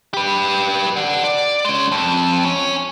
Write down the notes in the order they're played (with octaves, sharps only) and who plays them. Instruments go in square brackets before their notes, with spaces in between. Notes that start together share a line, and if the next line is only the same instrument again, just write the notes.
[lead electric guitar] G4 B4
D5 F#5
D5
G#3 C#4
F2
C#4